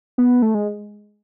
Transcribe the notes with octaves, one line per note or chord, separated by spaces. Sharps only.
B3
A3
G#3